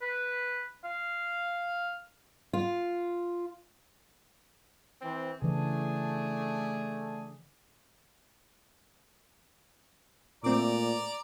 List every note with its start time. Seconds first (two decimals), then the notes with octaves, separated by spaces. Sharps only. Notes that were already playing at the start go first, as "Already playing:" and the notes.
0.02 B4
0.84 F5
2.53 F4
5.02 E3 C4
5.42 C#3 E3 A3 D4 G#4
10.44 A#2 A3 C4 D5 A#5 D6